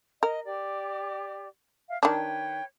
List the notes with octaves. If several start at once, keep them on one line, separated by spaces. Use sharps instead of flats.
A#4 D#5
G4 D5
E5 F5
D#3 D4 B4 C#5 G5